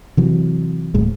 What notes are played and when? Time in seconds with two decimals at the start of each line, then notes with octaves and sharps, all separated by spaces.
0.17 C3 E3 F#3
0.94 D1 A2 G#3